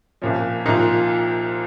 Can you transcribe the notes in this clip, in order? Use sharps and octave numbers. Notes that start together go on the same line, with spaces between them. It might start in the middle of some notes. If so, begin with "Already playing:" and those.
C2 A#2 F3 C#4
C2 A#2 F3 D#4
F4